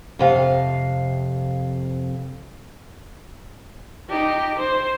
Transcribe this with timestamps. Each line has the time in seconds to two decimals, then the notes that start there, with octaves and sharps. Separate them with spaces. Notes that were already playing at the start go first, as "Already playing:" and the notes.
0.19 F2 C3 F5
4.09 D#4 G4
4.59 C5